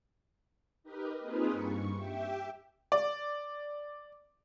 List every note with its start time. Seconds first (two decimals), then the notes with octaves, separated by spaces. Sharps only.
0.83 D#4 G4 A#4 B4
1.19 A#3 C4 D#4 F4 G#4 B4
1.51 G2 C#6
1.95 G4 E5 G5
2.92 D5